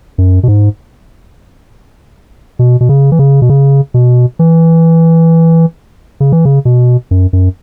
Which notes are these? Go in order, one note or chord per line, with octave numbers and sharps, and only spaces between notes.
F#2
B2
G#2
B2
B2
C#3
E3
C#3
B2
C#3
B2
E3
C#3
E3
C#3
B2
F#2
F#2